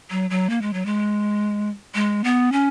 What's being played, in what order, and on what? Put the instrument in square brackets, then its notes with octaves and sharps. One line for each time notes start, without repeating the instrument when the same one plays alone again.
[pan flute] F#3
F#3
A#3
G#3
F#3
G#3
G#3
B3
C#4